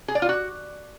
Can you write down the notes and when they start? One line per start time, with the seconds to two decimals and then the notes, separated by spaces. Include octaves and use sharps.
0.08 G#4
0.15 D5
0.22 F4
0.29 F#4